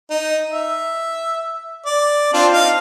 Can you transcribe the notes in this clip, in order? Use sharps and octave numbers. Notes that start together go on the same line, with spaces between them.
D#4
E5
D5
C4 D4 F4
D#4 F5